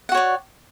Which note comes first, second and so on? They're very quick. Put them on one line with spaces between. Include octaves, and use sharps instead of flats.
F#5 F#4 C#5 D5